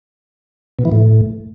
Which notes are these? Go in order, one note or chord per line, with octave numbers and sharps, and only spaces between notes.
B2
E3
A2